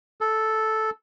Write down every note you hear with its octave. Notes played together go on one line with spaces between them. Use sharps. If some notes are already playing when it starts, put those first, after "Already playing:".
A4